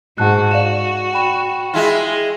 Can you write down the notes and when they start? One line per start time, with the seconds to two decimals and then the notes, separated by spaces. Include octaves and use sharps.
0.18 G#2 F#4 F#5 A5 F#6
0.51 F#4 D5 F5 E7
1.14 G5 B5 E7
1.73 G#3 E4 F4